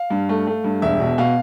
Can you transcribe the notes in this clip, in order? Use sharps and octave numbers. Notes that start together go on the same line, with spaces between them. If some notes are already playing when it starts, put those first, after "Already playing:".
Already playing: F5
G2
A3
A3
G2
E1 E5
B2
B2 F5